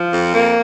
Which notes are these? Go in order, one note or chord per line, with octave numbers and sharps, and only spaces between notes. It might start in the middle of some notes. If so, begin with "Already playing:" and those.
Already playing: F3
F2
A#3